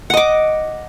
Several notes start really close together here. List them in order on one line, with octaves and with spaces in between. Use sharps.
F#5 D#5 D6